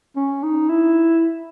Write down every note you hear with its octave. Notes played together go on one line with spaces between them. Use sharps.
C#4
D#4
E4